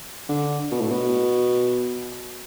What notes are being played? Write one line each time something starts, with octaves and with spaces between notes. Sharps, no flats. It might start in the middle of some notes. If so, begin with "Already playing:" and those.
D3
B2
A2
B2